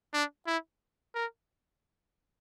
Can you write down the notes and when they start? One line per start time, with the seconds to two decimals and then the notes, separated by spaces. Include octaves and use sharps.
0.14 D4
0.47 E4
1.15 A#4